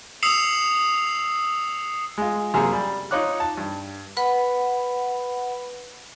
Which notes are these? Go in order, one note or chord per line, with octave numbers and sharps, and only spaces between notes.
D#6 E6 C7 C#7 E7 F7
G#3 F4
F#2 C3 A#3 G#4 A#5
G3
D#4 F4 C#5 D6 F#6
A5
G2
B4 F#5 B5